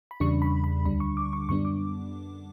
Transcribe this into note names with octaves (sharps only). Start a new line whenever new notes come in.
B5
E2 C#3 G3 D4 C#6
B5
B5
D2 D3 G3 D4 B5
C#6
D6
C#6
F#2 D3 G3 B3 D4 C#6
D6